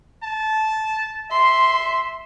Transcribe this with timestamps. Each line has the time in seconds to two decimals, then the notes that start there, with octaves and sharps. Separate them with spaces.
0.23 A5
1.31 E5 C6